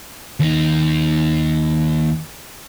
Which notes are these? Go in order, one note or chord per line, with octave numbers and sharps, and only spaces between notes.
D#2 D#4